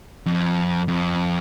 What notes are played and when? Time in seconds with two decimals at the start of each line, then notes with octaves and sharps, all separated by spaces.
0.26 F2
0.88 F2